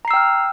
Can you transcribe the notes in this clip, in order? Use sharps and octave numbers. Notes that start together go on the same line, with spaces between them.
G5 A#5 E6 F6 C7